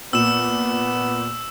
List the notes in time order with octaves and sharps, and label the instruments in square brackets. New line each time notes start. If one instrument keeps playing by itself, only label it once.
[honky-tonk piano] A#2 [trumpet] B3 [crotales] E6 E7